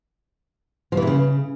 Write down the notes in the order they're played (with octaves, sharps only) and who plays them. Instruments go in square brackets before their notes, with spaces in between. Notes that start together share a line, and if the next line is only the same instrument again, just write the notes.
[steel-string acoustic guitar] F3
E3
C3
C#3